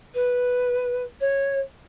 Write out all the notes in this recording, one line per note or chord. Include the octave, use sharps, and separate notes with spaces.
B4
C#5